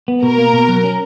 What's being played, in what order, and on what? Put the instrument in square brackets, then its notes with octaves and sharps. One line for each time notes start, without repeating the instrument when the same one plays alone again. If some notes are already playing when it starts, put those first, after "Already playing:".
[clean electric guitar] B3
[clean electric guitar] B2 [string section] A#4
[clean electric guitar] A#3
B2
F#3
C#4